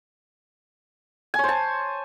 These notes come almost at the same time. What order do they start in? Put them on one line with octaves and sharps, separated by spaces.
G#5 C#5 C5 A5